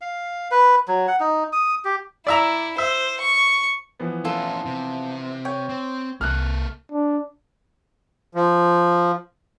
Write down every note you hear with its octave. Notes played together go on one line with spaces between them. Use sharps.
F5
B4
F#3
F#5
D#4
D#6
G4
E4 D5 E5 A#5
C5 E5
C#6
E3 F3 B3
C#4 E4 F4 A4
C3
C#5 G5
C4
C2 A#3 A4 F6 F#6
D4
F3